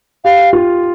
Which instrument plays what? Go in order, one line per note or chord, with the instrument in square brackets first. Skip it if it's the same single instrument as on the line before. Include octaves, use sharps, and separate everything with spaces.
[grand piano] G4 [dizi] F5
[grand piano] F4